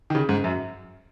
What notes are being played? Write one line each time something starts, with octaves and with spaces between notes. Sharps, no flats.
D#3
C#3
G#2
F#2